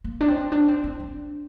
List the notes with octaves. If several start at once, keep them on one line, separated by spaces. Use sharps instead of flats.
A#3
D4
C4
D4
C4
C4
D4